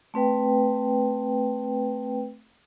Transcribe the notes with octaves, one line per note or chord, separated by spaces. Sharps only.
A3 C4 B4 G5